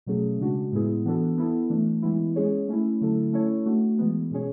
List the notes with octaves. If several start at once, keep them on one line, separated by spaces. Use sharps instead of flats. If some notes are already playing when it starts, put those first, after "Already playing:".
B2 F#3 A3 C#4 G#4
C#3 G#3 D4 F#4
A2 G#3 B3 E4 G#4
E3 B3 D4 F#4 A4
B3 E4 A4
E3 A3 D4
E3 G#3 B3 E4
G#3 C#4 G#4 C#5
A3 C#4 E4
D3 F#3 A3 E4 A4
A3 C#4 E4 A4 C#5
A3 D4 F#4
E3 G#3 B3
B2 G#3 C#4 G#4 C#5